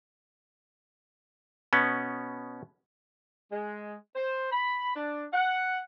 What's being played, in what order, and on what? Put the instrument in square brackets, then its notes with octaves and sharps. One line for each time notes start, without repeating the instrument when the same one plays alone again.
[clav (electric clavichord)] B2 B3 C#4
[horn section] G#3
C5
B5
D4
F#5